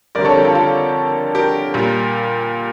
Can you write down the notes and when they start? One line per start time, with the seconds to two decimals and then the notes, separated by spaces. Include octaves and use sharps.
0.15 F2 D3 G3 A#4 D5
0.25 A4 C#5
0.35 G4 A#4
0.44 F4 A4
0.54 F4 A4
1.35 G4 A#4
1.74 A#2 G3